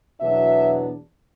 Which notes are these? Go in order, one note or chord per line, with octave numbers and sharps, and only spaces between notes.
E2 B2 F#3 B3 D4 E5